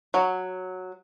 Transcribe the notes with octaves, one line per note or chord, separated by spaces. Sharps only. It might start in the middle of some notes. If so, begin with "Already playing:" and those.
F#3